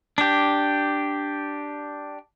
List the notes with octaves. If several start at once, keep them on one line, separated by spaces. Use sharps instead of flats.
D4 G4